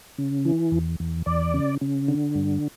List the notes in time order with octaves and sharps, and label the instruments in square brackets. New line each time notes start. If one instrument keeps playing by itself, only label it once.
[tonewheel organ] C#3
E3
E2
E2
E2 D5
C#3
C#3
D3
G2